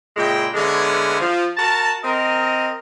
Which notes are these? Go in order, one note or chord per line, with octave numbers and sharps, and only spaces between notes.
A#2 C#3 G#3 E4 G5
D3 E3 G#3 B3 C#4
F3
F#4 A#4 A5
C4 A#4 D#5